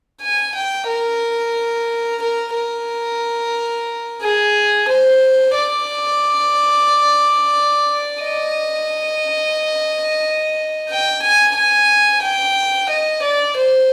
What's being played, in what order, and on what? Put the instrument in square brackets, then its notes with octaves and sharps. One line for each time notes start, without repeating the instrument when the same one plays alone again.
[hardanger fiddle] G#5
G5
A#4
A#4
A#4
G#4
C5
D5
D#5
G5
G#5
G#5
G5
D#5
D5
C5